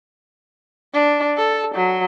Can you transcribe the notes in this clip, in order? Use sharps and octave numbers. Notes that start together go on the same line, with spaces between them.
D4
A4
F#3